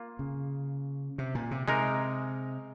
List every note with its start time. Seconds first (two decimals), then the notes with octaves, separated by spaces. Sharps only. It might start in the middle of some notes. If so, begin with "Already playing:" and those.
Already playing: A#3 F4
0.19 C#3
1.18 C3
1.35 A#2
1.51 C3
1.68 C3 G#3 D#4 A#4